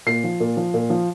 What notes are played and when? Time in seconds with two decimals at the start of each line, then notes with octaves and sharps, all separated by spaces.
0.06 A#2 C7
0.24 F3
0.40 A#2
0.57 F3
0.74 A#2
0.90 F3